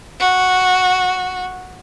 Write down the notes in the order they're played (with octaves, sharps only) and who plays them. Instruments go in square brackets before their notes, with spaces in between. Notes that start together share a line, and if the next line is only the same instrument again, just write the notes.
[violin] F#4